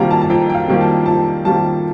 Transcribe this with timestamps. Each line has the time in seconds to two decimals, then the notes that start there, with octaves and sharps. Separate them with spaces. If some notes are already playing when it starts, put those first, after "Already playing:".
Already playing: F2 C3 D#3 G3 A#3 A5 A#5
0.11 A5
0.21 A5
0.30 F2 G5
0.49 G5
0.55 F5
0.68 C3 D#3 G3 A#3
0.81 A5
1.06 F2 A5
1.44 C3 D#3 G3 A#3 A5